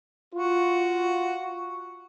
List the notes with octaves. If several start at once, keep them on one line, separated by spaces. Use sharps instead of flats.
F4 F#4